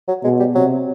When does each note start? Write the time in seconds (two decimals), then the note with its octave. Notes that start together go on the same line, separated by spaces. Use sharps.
0.08 F#3
0.24 B2 G#3
0.40 G3
0.55 C3 F#3